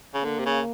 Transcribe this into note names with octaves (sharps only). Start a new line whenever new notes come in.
C#3
D3 A#3
C3
C#3